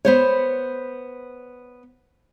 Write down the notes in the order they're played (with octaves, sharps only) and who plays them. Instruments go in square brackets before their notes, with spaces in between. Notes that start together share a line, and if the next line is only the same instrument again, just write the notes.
[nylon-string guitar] B3 C5 C#5